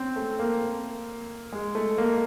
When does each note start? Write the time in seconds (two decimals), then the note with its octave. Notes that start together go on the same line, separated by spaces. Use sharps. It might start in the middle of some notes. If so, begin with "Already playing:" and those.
Already playing: C4 C#4
0.16 A3
0.39 A#3
1.52 G#3
1.75 A3
1.98 A#3